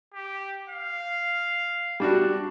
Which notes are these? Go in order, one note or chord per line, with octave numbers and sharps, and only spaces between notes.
G4
F5
G3 D4 F#4